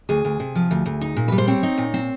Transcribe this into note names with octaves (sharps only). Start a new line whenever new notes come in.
D2 G#4
D2
C3
F3
D2
D2
D#4
A#2
G3 B4
C5
C4 C#5
D#4
A#2
C4